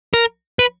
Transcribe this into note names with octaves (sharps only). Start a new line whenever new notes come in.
A#4
B4